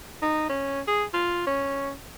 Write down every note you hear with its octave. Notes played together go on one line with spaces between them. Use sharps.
D#4
C#4
G#4
F4
C#4